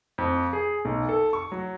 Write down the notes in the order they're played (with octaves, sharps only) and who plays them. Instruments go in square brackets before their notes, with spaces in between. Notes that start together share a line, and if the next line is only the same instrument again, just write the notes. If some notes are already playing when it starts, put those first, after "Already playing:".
[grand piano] F2
G#4
B1
A4
C#6
F#3